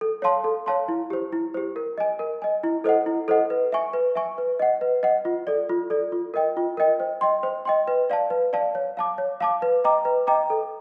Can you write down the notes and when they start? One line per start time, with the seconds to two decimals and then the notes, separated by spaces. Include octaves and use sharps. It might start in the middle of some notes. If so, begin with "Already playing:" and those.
0.01 A4
0.22 C#5 F5 A5 C6
0.44 A4
0.66 C#5 F5 A5 C6
0.88 E4
1.10 G4 C5
1.32 E4
1.54 G4 C5
1.76 A#4
1.98 D#5 G#5
2.19 A#4
2.42 D#5 G#5
2.64 E4
2.84 A4 C5 D#5 F#5
3.06 E4
3.28 A4 C5 D#5 F#5
3.50 B4
3.72 E5 G#5 C#6
3.93 B4
4.15 E5 G#5 C#6
4.38 B4
4.59 D#5 F#5
4.81 B4
5.03 D#5 F#5
5.25 F4
5.47 A4 D5
5.69 F4
5.90 A4 D5
6.12 F4
6.34 A#4 D#5 G5
6.57 F4
6.77 A#4 D#5 G5
7.00 C5
7.21 D#5 G5 C6
7.43 C5
7.65 D#5 G5 C6
7.88 B4
8.10 D5 F5 A5
8.30 B4
8.53 D5 F5 A5
8.75 C#5
8.97 F5 A5 D6
9.18 C#5
9.40 F5 A5 D6
9.62 B4
9.84 D#5 G5 A#5 D6
10.05 B4
10.27 D#5 G5 A#5 D6
10.50 A4